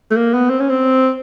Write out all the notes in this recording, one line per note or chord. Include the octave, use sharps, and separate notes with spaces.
A3
A#3
B3
C4
C#4
C4